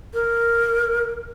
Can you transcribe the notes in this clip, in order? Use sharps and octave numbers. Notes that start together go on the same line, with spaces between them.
A#4